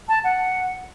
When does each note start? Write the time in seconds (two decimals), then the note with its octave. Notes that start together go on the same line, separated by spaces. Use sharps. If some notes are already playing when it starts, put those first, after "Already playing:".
0.09 A5
0.24 F#5